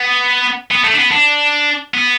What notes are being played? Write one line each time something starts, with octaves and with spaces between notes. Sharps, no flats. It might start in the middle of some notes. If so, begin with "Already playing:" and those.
Already playing: B3
B3
A3
D4
B3
D4
B3